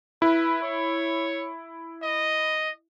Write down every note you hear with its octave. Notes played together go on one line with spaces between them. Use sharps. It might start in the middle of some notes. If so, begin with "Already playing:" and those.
E4 B4
C#5
D#5